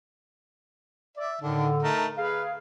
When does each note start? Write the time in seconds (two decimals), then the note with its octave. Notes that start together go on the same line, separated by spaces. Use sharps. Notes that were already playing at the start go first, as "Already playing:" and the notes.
1.17 D5 E5
1.41 A2 D3 D#3 D4
1.82 A3 D#4 A#4
2.18 G#4 B4 F5